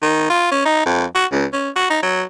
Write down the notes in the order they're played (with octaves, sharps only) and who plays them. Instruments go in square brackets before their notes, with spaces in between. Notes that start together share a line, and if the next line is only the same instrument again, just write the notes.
[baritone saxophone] D#3
F4
C#4
D#4
F2
F#4
C#2
C#4
F#4
D#4
F#3